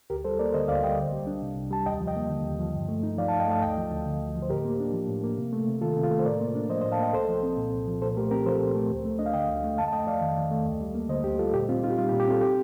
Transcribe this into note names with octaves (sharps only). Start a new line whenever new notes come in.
D2 G4 A#4
G3 A4 C5
A#3 A#4 D5
D3 C5 D#5
D2 D5 F5
G3 D#5 G5
C2
G3
D4
C3
C2
G3 A5
D#2 D#5 G5
F3
D#5 G5
A#3
D3
D#2
F3
G2
A3
D#4
F3 D5 F5
F5 A5
G2
D#5 G5
A3 F5 A5
D2 D#5 G5
F3
D2
D3
D2
F3
C5
A2 G4 A#4
A#3
D4
F3
A2
A#3
C3
A3
C3
D#3 F4 A4
C3
F4
A3
C5
A2 A#4 D5
A#3
D4
F3 C5 D#5
C5 D#5
A2
F5 A5
A#3 D#5 G5
C2 A4 C5
F3
C4
A#2
C2
F3
A#2 A4 C5
A3 G4 A#4
C4 G4 A#4
F3 A4 C5
A#2
A3
D2
A3
D4 D#5
F5
D3 D#5 G5
D2
A3
F2 F5 A5
A5
A3 D#5 G5
F2 D5 F5
D#3
F2
A3
D2
G3
A#3
D3 C5 D#5
D2 G4
G3 F4 A4
A#2 G4
C4 F4
D#4 F4
G4
G3 F4
G4
A#2
G4
C4 F4 A4
G4